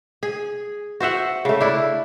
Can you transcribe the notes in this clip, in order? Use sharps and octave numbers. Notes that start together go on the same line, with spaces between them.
G#4
F#4 C5 E5 F#5
C#3 A3
D4 E4